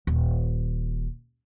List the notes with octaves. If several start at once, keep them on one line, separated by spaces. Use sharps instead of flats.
D#1